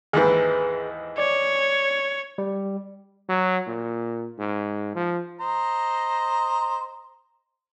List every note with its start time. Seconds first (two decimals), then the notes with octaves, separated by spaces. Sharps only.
0.13 D#2 G#2 E3 G#4 B4
1.18 C#5 D5
2.38 G3
3.29 F#3
3.67 A#2
4.39 G#2
4.95 F3
5.40 C5 D#5 A#5